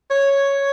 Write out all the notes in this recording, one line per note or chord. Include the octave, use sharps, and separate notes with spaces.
C#5